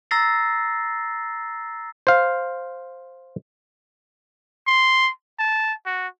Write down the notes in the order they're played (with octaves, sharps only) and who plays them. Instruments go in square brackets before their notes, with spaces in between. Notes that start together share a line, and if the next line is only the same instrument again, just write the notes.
[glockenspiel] A#5 E6 A6 A#6 C7
[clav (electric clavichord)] C5 F5
[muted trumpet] C6
A5
F#4